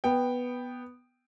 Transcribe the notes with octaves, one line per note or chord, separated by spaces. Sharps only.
B3 G5